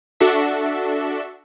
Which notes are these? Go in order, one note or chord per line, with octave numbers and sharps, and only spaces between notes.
D4 F#4 A4 E5